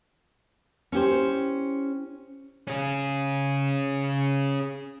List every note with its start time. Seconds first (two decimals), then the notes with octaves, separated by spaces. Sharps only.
0.92 C#4 E4 G4 C5
2.67 C#4 G#4